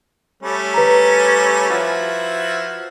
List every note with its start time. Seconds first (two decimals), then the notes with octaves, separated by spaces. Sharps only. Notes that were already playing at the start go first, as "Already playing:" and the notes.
0.43 G3 A3 C#4
0.74 B4 A#5
1.70 F3 E4 F#4